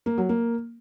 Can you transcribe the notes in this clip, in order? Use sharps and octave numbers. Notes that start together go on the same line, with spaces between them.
A#3
F#3
A#3